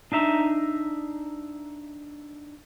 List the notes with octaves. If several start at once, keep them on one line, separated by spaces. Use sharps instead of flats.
D4 D#4 E5 A#5